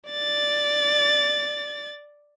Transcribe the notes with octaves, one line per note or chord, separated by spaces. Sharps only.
D5 A6